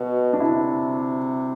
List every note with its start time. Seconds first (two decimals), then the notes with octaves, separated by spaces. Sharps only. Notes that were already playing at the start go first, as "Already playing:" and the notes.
Already playing: B2 F#4
0.33 D4
0.40 C3 E4